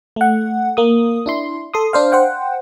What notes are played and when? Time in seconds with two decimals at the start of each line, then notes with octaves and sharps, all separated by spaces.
0.16 A3 F#5
0.77 A#3 D#6
1.26 D4 E4 C6
1.74 A4 C6 D#6
1.93 D4 C5 F5
2.12 C5 F#5 G5